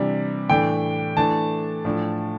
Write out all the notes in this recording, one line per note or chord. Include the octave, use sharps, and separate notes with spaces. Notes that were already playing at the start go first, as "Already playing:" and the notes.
Already playing: C3 E3 G3 D4
A2 E3 A3 D4 G5
E3 A3 D4 A5
A2 F3 A3 D4